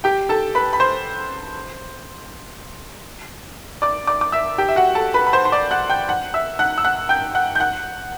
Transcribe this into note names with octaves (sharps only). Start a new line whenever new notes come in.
G4 G5
A4 A5
B4 B5
B5
C5 C6
D5 D6
D5 D6
D6
E5 E6
G4 G5
E5
F#4 F#5
A4 A5
B4 B5
B5
C5 C6
C6
D5 D6
F#5 F#6
G5 G6
F#5 F#6
E5 E6
F#5 F#6
E6
F#5 F#6
G5 G6
F#5 F#6
G6
F#5 F#6